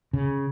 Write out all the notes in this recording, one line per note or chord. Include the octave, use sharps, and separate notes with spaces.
C#3